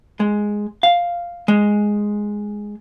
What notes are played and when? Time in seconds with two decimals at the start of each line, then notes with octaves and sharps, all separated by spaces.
0.20 G#3
0.83 F5
1.48 G#3